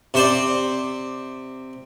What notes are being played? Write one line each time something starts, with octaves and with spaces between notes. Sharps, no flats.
C3 C5 D5